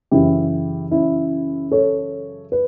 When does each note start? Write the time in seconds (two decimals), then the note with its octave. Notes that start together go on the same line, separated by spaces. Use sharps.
0.11 F#2 C#3 E3 E4 G4
0.91 C#4 E4
1.71 A4 C#5
2.52 B4